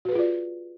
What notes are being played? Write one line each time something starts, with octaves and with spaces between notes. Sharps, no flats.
F4 F#4 G#4 B4 D5